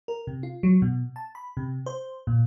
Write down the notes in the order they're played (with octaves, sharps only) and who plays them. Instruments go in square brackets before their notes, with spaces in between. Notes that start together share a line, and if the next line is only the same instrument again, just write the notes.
[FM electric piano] A#4
C3
F4
F#3
B2
A5
B5
C3
C5
A#2